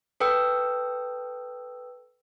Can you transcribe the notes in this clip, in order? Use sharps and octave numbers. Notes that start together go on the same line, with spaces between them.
A4 B4 G5 E6